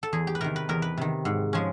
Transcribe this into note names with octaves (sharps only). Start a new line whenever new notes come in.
A4
E2 G#4
G4
B4
C3 D#3 A#4
B4
E2 A#4
B4
C3 D#3
G#2
F3 G#3 C#4